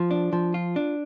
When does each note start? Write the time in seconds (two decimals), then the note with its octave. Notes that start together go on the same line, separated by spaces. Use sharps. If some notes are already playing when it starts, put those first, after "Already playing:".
Already playing: F3
0.11 D4
0.33 F3
0.54 F4
0.76 D4